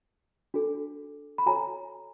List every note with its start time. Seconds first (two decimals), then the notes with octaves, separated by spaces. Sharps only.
0.54 D4 F#4 A4
1.38 B5
1.46 F#4 A4 C#5 G#5 A#5